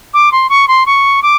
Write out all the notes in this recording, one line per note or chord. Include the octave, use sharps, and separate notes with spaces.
D6
C6
C#6
C6
C#6
D6